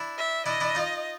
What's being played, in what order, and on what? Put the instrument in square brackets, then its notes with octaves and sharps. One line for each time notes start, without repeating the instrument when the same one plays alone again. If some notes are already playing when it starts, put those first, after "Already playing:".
Already playing: [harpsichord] D4 E4
[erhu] E5
[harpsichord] D4 E4 [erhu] D#5
[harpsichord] D4 E4
D#4 F4